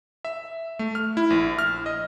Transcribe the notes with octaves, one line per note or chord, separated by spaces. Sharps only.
E5
A3
F6
E4
A#1
F6
D#5